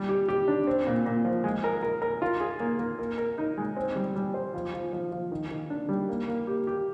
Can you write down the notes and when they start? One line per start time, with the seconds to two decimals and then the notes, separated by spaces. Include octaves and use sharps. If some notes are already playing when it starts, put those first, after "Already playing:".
Already playing: G3
0.09 G4
0.29 G4
0.48 D4
0.67 C4
0.87 A#2
1.06 A#2
1.25 F3
1.44 G#3
1.64 A#4
1.83 A#4
2.02 A#4
2.22 F4
2.41 G#4
2.60 A#3
2.79 A#3
2.99 A#4
3.18 A#4
3.38 D#4
3.58 G#3
3.77 C4
3.96 G3
4.16 G3
4.34 C5
4.54 F3
4.74 F3
4.93 F3
5.12 F3
5.32 D#3
5.51 D#3
5.70 D4
5.89 G3
6.09 A#3
6.28 A#3
6.47 G4
6.67 G4